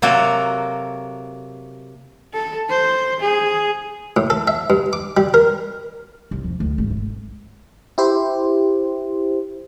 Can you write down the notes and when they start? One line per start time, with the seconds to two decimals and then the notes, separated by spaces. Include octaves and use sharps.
0.02 C3 F#3 A#3 F#4 A4 A#4
2.33 A4
2.69 C5
3.20 G#4
4.17 A2
4.30 A4
4.48 E5
4.70 G2
4.93 D6
5.17 G3
5.34 A#4
6.31 C2
6.44 F2
6.60 D2
6.78 G#1
6.90 A3
7.98 E4 G4 C5